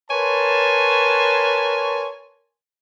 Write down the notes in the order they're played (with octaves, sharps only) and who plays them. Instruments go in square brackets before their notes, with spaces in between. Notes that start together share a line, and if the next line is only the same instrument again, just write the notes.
[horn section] A#4 B4 C#5 G#5 A5 C6